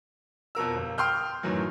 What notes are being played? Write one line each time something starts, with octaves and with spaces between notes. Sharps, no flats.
F2 B2 A#4 E6
G1
G5 C6 D#6 F6 G6
F#2 A2 D#3 E3 F#3